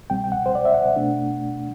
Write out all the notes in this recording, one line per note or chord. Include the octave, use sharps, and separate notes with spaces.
C2 B2 G3 C4 G5
G5
F#5
C5
D5
E5
F#5
B2 A3 D4